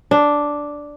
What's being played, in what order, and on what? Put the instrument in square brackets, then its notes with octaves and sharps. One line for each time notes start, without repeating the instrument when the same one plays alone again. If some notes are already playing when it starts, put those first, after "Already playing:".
[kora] D4